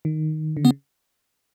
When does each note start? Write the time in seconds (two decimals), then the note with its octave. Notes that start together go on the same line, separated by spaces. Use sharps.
0.05 D#3
0.57 D3
0.65 C#3 B3